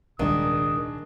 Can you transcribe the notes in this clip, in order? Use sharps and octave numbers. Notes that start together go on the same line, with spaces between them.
D#1 C2 D#3 G#3 D4 D#6